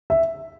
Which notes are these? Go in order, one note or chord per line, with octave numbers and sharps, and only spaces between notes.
E5